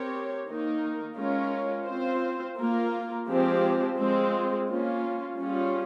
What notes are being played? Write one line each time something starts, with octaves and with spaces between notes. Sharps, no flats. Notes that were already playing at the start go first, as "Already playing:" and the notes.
Already playing: C4 G4 A#4 C#5
D#3 A#3 D#4 A#4
G#3 C#4 F4 A#4 C#5
C4 F4 C5
A#3 F4 A#4
F3 G#3 C4 G4 C5
G#3 C4 F4
A#3 C#4 F4
G3 C#4 F4 G#4